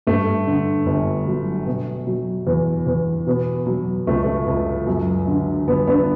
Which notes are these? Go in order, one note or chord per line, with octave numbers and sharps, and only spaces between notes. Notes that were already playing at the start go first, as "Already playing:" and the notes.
G2 A3
D3
G1
F#3
B2
F#3
E2
E2
B2 B3
F#3
C#2 A3
A3
C#2
F#2
D3
G1 B3
B3 D4